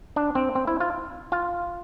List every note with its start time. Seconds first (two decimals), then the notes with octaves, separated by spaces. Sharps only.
0.16 D4
0.35 C4
0.55 C4
0.67 E4
0.80 F4
1.32 F4